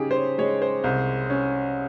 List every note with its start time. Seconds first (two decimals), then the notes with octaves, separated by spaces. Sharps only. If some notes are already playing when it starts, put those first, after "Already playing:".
Already playing: C#3 D#4 G4 G#4
0.11 C5
0.16 C#5
0.38 G#3 C#5
0.62 C5
0.84 C2
1.30 C#4